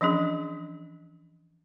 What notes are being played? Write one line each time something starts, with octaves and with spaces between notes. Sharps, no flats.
E3 F3 C#4 D4 G#4